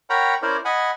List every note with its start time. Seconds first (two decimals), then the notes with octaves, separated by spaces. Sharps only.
0.10 A#4 C#5 F#5 G5 A#5 B5
0.42 C#4 E4 A#4 C5 D5
0.65 D#5 F#5 G#5 B5